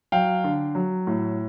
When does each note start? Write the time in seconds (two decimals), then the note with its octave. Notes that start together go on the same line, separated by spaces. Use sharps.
0.12 F#3 F5 G5
0.44 D3
0.75 F#3
1.07 A2